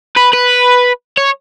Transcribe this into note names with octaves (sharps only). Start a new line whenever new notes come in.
B4
B4
C#5